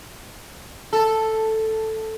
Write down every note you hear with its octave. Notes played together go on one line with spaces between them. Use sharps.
A4